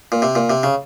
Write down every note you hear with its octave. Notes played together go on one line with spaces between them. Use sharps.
A#2
C3
A#2
C3
C#3